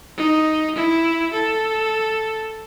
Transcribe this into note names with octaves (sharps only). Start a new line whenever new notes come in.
D#4
E4
A4